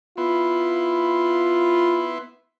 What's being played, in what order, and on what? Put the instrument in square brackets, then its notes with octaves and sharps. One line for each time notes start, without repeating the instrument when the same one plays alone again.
[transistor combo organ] B3 E4 C6 [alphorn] F4